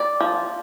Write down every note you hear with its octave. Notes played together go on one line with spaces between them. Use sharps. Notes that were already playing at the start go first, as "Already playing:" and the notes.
Already playing: D5
F3